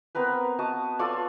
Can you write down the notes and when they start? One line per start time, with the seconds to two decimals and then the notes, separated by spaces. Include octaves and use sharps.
0.15 B3 C4 A#4 B4
0.59 F#4 D#5 A5
0.99 F4 A4 C#5 D5